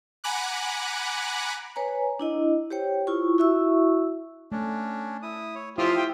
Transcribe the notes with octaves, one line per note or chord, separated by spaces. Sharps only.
F#5 G#5 A#5 B5 D6 F#6
B4 C#5 G#5 A#5
D4 E4 D#5
G4 C5 C#5 G5
E4 F4 C#6
E4 F#4 E5 C#6 E6
A3 C#4 D4
E4 D#6
C#5
F3 E4 F4 G4 E5 F5 D#6
G5